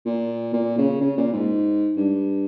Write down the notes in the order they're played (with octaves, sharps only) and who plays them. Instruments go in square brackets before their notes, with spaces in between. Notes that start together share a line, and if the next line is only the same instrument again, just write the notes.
[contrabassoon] A#2
A#2
C#3
C#3
A#2
G#2
G2